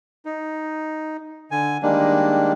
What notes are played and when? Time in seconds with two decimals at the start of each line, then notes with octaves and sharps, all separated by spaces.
0.25 D#4
1.51 D3 G#5
1.83 D#3 G3 G#3 A#3 D4